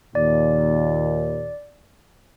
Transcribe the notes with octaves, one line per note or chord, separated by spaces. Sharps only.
D#2 A#2 D5